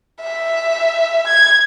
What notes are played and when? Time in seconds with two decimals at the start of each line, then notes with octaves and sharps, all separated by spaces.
0.21 E5
1.27 G#6